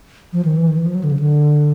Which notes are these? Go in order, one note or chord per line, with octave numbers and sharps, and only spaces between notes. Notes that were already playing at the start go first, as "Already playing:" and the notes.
F3
D#3
E3
D#3
E3
F3
F#3
D3
C#3
D3